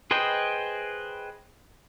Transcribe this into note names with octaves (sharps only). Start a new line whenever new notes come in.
G#4 B4 C5 D#5 G5